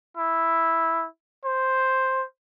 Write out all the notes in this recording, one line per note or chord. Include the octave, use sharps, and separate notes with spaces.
E4
C5